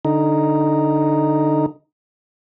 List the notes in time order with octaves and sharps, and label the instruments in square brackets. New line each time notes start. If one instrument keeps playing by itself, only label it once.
[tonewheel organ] D3 D#4